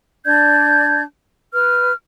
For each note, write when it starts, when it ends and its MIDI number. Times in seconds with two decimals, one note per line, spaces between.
0.25 1.01 62
0.25 1.01 74
0.25 1.01 91
0.25 1.01 92
1.53 1.91 71
1.53 1.91 89